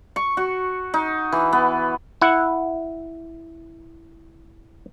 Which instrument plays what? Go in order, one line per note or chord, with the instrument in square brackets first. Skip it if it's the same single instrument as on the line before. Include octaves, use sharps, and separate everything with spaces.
[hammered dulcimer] C#6
F#4
D#4
E3
B3
[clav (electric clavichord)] E4 F#5